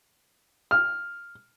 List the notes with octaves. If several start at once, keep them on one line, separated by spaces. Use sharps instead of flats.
F6